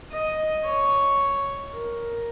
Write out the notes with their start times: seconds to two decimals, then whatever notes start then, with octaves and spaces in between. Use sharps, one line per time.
0.11 D#5
0.64 C#5
1.72 A#4